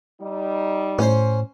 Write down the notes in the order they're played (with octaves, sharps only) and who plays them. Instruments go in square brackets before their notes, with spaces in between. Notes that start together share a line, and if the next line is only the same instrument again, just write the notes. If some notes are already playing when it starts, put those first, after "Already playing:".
[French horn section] G3 D#4
[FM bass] A2 [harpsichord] C#4 C5